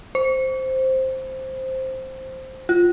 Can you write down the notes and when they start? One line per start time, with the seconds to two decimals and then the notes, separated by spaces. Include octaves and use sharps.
0.15 C5
2.69 F4